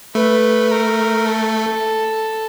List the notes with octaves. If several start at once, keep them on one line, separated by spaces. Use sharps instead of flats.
A3 B4
A#4
A4